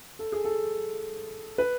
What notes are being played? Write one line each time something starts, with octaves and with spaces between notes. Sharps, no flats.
A4
G#4
A4
B4